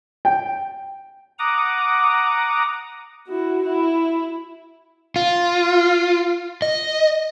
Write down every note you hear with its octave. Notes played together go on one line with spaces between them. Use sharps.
G5
F#5 A#5 D6 D#6
E4 F#4
E4
F4
D#5